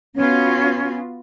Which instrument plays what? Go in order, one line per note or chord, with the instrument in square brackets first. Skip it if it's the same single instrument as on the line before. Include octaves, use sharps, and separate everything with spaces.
[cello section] B3 F4 F#4 [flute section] C#4